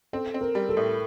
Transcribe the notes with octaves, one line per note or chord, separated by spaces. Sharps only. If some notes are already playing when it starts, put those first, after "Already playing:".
C4 A4
C4
A#4
G3
A4
A2